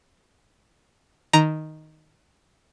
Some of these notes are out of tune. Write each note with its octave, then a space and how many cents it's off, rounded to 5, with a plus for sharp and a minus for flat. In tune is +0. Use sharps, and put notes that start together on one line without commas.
D#3 +0 A#5 +0